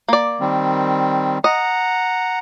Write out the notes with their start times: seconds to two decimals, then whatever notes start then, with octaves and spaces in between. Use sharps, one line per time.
0.09 A#3 D5
0.40 D#3 G3 C4
1.44 D#5 F#5 A#5